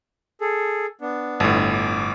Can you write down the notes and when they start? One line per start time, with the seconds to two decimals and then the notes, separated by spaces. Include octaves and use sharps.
0.41 G#4 A4
1.01 B3 D4
1.40 G1 A2
1.73 D6